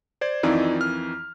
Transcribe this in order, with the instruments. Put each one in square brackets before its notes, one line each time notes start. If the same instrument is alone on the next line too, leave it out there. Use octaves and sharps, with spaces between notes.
[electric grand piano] C5 D5 G#6
[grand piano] F2 D#3 E3 [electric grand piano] D#4 F4 D5
[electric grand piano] F6